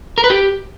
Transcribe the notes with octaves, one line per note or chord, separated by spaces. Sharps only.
A#4
B4
G4